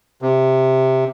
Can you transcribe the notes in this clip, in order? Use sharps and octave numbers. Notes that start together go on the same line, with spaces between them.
C3